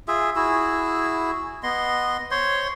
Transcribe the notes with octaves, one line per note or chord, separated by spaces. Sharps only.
F4 G#4 E5
E4 F#4 G#4 E6
B3 D#5 C6
C5 C#5 C6